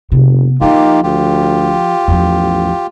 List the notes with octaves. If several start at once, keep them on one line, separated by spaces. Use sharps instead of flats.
F#1 C3 B3
D#3 F3 A#3 D#4 F4 G4
D2 F4 G4
A1 E2 F3